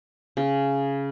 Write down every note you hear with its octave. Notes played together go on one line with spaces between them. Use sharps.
C#3